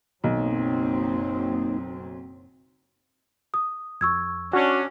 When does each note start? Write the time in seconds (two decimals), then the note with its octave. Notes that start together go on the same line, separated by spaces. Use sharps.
0.24 F#1 B1 F#3 A#3 C4 D#4
3.54 D#6
4.01 F2 C#6 E6 G#6
4.53 C#4 D4 F#4